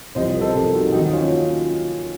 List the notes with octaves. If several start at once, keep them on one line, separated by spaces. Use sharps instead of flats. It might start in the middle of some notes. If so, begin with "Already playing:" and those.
C2 C3 F3 C5 D#5
A#4
A4 C5
C2 C3 F3
D#4 F#4
D#2 D#3 F#3 D#4 F#4
C#4 F4